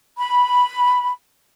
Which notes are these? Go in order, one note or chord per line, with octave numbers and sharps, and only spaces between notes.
B5